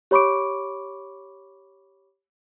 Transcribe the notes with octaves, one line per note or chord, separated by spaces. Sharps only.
G4 C#5 B5 C#6 D6 D7